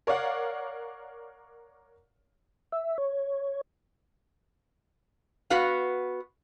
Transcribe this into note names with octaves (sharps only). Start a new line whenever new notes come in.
A#4 C#5 D5 F5 F#5
E5
C#5
B3 F#4 B4 F5